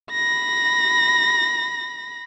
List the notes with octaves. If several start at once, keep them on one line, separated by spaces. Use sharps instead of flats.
B5 A#6